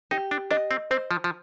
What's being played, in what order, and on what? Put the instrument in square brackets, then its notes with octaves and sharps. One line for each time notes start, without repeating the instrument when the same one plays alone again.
[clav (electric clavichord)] D#4 [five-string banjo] G4
[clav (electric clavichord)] D4
[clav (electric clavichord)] D4 [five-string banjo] D#5
[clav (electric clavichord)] C4
[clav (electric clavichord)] C4 [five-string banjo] C5
[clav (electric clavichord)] F3
F3